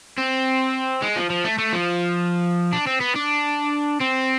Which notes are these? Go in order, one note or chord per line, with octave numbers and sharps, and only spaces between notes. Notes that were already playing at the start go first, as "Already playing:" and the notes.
C4
G#3
F3
F3
A3
A3
F3
D4
C4
B3
D4
C4